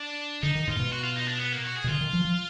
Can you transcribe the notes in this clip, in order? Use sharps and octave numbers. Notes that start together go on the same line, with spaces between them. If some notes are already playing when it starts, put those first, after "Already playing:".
Already playing: D4
D3 D#4
D#3
G#2 F4
B2
F#4
F4
D#4
D4
B3
A#3
F#4
G#4
B2
D3 F4
D#3
F3
F3